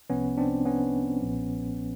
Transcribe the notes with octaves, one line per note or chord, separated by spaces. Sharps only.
C2 C3 F3 B3 C#4
C4 D4
B3 C#4
B1 A#2 F3